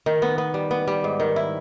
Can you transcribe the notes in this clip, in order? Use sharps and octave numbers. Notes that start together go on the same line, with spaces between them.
D#3
B3
B3
G3
B3
G3
G#2
D#3
E4